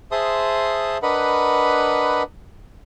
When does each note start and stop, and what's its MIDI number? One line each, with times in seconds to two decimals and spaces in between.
0.11 0.98 68
0.11 0.98 72
0.11 0.98 76
0.11 0.98 81
0.11 0.98 84
0.11 0.98 87
1.03 2.23 62
1.03 2.23 70
1.03 2.23 71
1.03 2.23 75
1.03 2.23 78
1.03 2.23 83